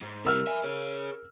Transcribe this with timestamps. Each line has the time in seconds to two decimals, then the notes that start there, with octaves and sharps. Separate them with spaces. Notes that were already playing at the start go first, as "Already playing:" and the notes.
0.01 G#2
0.25 C3 G3 A#4 E6 F6
0.47 E5 G#5
0.63 G#4 C#5